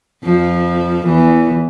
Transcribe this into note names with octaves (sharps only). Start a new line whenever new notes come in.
F2 F3
E2 E3